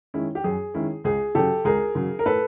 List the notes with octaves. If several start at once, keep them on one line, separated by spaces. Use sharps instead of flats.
D#3 G#3 C#4 E4
G4
F#2 G#4
D#3 G#3 C#4 E4
C#2 G#4
C#3 F#3 G4 A4
C#2 G#4 A#4
C#3 F#3
A#4
A2 A4 B4